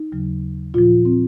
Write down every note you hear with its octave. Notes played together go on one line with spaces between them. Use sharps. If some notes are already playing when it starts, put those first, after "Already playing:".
Already playing: D#4
D#2 C#3 F#3
A#2 F3 F4
C4